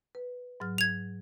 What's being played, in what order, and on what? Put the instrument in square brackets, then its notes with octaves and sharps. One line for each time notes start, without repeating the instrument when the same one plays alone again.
[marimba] B4
G#2 F#3 F6
[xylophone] G#6 F7